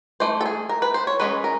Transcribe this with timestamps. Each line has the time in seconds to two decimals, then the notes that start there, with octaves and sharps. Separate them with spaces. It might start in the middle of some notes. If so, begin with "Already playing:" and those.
0.20 E3 A3 C5
0.41 A4
0.46 G#4
0.69 A#4
0.82 B4
0.94 C5
1.07 C#5
1.20 E3 G#3 C#4 B4
1.44 A#4